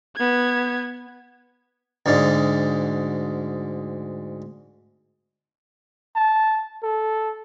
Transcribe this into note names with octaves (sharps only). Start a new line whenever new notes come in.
B3 G#6
D2 G#2
A5
A4